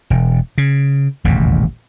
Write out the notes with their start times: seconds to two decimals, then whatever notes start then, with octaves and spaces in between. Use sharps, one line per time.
0.10 E1
0.58 C#3
1.24 D#1 A1 E2 C3